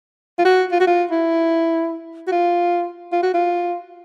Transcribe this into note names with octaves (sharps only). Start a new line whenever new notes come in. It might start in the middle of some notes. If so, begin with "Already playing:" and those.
F4
F#4
F4
F#4
F4
E4
F#4
F4
F4
F#4
F4